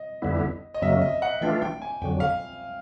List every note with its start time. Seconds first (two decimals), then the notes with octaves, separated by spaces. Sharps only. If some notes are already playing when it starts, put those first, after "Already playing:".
Already playing: D#5
0.22 F2 D3 G3 B3 E4
0.74 D#5
0.82 F#2 C#3 F#3 A#3 E5
1.02 D#5
1.22 F#5
1.41 E3 A3 D4 F4 G5
1.62 G5
1.82 G#5
2.02 F2 D3 F#3 G5
2.20 F5